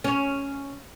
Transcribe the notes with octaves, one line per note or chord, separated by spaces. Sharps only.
C#4